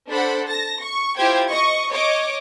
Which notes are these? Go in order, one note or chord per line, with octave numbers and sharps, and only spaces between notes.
D4 A4 C5 F#5 B5
A5 A#6
C#6
E4 F4 G4 C5 G5 G#6
D#5 C#6
C#5 D#5 D6